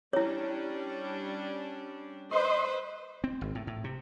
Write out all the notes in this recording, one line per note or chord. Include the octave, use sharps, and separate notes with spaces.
G3 C#4 D4 E4 C#5
B4 C5 D#5 C6
C4
G#1
A2
A2
C3